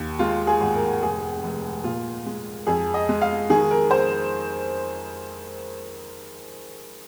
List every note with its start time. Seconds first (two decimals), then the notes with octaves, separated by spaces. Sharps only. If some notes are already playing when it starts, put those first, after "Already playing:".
Already playing: D#2
0.19 G#3 F4
0.47 G#4
0.60 G#1
0.75 A#4
1.02 F1 G#4
1.43 F1
1.84 A#2 F4
2.26 G#3
2.67 F2 G#4
2.94 D#5
3.09 G#3
3.22 F5
3.50 D#3 G#4
3.71 A#4
3.91 C5